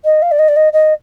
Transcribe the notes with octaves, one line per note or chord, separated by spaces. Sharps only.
D#5
F5
D5
D#5
D5
D#5
D#5